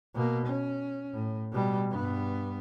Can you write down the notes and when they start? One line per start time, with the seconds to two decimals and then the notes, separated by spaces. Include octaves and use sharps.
0.15 B2 A#3
0.47 C#4
1.13 A2
1.52 B2 G3
1.90 G2 B3